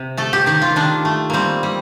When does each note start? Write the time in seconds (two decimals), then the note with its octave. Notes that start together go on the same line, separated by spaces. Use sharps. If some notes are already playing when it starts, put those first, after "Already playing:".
Already playing: C3
0.17 A3 A4
0.33 G4
0.46 D#3 G4
0.62 F4
0.76 D#3 D4
1.05 A3
1.30 G3 A#3 C4
1.63 G3